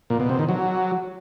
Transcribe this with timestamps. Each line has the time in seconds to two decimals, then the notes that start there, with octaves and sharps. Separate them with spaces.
0.10 A#2
0.20 B2
0.29 C3
0.39 D#3
0.49 F#3